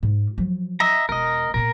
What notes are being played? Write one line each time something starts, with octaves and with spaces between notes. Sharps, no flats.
G#2
F3 F#3
D#5 E5 A#5
E1 A#4 D#5
A#2 B3 A#4